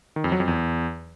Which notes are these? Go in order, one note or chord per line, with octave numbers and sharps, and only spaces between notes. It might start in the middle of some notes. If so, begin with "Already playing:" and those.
D#3
F2
F#3
F2
E2